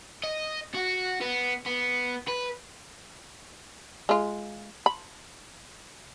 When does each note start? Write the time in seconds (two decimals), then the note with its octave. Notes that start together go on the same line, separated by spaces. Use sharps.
0.24 D#5
0.74 F#4
1.21 B3
1.66 B3
2.28 B4
4.09 G#3 F4
4.86 B5